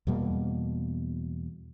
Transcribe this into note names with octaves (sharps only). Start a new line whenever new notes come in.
E2 B2 G3 A#3